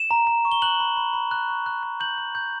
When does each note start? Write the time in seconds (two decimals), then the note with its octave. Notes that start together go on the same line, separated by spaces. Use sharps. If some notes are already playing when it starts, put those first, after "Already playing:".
Already playing: E7
0.11 A#5
0.27 A#5
0.45 C#6
0.52 G7
0.62 F#6 F#7
0.80 B5
0.97 B5
1.14 B5
1.31 F#6
1.49 C#6
1.66 F#6
1.83 F#6
2.00 G6 F#7
2.18 G6
2.35 G6